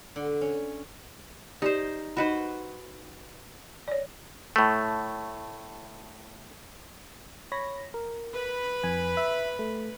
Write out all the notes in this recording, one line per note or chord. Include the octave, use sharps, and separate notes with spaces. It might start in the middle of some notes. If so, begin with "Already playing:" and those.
D3
C#4
D#4 G4 C5 D5
D#4 F#4 B4 C5 D#5 B5
C#5 D5
A2 A3
C#5 B5 A#6
A#4
B4 B5
F2 G#5
E5
A3